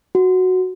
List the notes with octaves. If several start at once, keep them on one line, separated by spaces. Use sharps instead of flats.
F#4